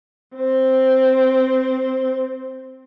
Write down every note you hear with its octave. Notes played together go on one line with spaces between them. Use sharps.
C4 C5